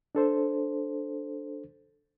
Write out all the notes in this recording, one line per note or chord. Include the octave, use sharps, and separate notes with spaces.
D4 A4 C5